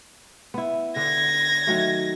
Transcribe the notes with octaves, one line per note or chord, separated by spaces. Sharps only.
B3 E4
D3 G#6 A#6
D#3 F#3 A3